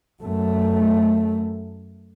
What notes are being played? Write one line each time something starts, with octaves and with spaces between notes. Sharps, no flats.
F#2 A3